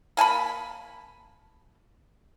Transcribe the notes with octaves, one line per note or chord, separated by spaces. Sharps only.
A#3 G#5 A5 B5